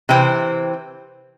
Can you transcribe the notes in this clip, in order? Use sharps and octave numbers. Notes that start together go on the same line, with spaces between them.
C3 E3 C4